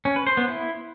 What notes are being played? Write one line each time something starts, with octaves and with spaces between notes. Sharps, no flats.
C#4
B4
C5
B3
E4